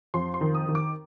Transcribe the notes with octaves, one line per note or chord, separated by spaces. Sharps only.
F2 C6
C6
D#3
D#6
D#3
D6